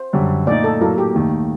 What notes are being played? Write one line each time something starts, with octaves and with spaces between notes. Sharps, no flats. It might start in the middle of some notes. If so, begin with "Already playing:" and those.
Already playing: C5
F#2 D3 G3
A#2 A3 D#4 D5
A4
A2 F#3 A#3 A4
G4
D#2 D#3 A3